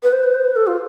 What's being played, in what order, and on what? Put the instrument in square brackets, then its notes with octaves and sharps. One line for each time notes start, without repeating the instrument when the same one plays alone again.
[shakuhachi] B4
C5
B4
C5
B4
A4
F4